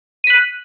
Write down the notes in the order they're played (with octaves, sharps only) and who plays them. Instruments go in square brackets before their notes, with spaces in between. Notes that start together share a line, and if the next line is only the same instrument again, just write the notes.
[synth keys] D#7
B6
F#6